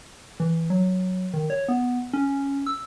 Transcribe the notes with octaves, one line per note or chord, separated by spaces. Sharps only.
E3
F#3
D#3
C#5
B3
C#4
E6